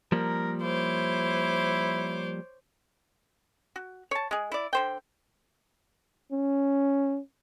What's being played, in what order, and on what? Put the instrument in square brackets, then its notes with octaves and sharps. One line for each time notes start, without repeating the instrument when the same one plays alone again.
[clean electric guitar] F3 G3 A#3 [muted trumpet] A#4
[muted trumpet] E4 [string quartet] C5 C#5 D6
[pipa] F#4
C#5 A5
G#3 G#4
E4 D5
D3 C5 G5
[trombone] C#4